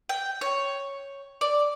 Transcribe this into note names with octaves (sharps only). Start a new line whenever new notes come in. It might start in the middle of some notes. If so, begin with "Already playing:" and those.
G5
C#5
D5